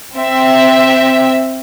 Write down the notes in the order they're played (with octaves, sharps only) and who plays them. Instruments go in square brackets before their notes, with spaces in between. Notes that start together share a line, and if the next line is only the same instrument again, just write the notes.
[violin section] C4 E5